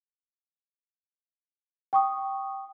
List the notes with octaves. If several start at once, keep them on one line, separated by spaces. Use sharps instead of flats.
G5 C#6 D#6